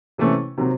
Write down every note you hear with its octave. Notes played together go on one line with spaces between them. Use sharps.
C3 E3 A3 C#4
C3 D#3 F#3 C4